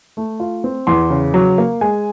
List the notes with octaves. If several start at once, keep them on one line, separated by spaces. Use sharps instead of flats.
A3
F4
C4
E2 C6
C#3
F#3
A#3
G#3 G#5